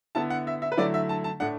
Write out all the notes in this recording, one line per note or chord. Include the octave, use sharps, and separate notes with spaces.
D3 B3 E4 A5
F#5
E5
E5
B4
D3 F#3 A3 E4 D5
E5
A5
A5
A2 A3 D4 F#5